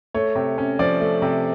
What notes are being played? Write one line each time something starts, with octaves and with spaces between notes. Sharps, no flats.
A3 C#5
C3
C#4
F3 D5
A3
C3